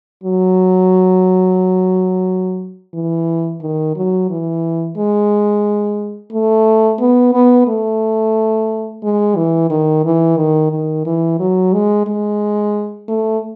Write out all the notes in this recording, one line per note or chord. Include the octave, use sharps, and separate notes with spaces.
F#3
E3
D#3
F#3
E3
G#3
A3
B3
B3
A3
G#3
E3
D#3
E3
D#3
D#3
E3
F#3
G#3
G#3
A3